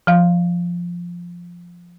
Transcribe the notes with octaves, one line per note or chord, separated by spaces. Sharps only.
F3 F5